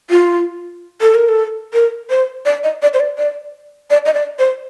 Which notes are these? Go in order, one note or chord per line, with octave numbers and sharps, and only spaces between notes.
F4
A4
A#4
A4
A#4
C5
D5
D#5
D5
C5
D5
D5
D5
D#5
D5
C5